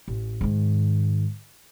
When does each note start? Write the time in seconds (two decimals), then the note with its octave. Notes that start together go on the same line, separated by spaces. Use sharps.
0.08 A1
0.41 G#2 D#3